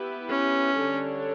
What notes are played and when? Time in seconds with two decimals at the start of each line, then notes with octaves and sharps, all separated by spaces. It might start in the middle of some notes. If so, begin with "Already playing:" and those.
Already playing: B3 E4 G4 B4
0.30 C#4
0.76 D3 G3 D4 A4 C#5